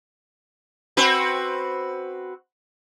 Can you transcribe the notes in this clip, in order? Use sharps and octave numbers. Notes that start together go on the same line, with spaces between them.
C4 F#4 B4